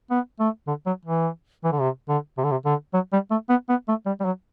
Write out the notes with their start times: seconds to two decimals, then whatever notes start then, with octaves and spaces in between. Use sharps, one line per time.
0.11 B3
0.40 A3
0.67 D3
0.86 F#3
1.05 E3
1.64 E3
1.72 D3
1.80 C3
2.09 D3
2.38 C3
2.44 D3
2.51 C3
2.66 D3
2.93 F#3
3.13 G3
3.31 A3
3.49 B3
3.69 B3
3.88 A3
4.06 G3
4.20 G3
4.25 F#3